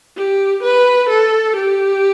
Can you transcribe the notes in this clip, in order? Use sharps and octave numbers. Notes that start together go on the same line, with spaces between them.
G4
B4
A4
G4